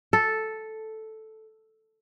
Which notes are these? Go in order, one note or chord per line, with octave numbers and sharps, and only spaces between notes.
A4